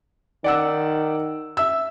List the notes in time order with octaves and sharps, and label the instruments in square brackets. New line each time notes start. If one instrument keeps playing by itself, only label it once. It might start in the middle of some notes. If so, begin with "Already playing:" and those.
[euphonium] D#3 [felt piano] D5 F#5 E6
[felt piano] E5 E6